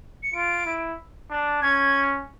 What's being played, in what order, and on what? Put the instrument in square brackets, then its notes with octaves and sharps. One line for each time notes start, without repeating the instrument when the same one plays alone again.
[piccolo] C#7
[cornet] F4 [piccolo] D7
[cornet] E4
D4
[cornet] C#4 [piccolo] G#6